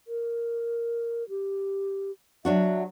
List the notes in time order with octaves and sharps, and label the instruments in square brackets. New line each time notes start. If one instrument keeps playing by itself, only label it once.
[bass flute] A#4
G4
[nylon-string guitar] F#3 D4 F#4 [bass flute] E5